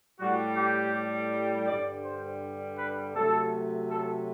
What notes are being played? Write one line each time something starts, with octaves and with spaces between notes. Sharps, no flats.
A2 G3 F#4
G4
G2 D3 G3 D5
C5
B4
C3 F#3 A3 A4
A4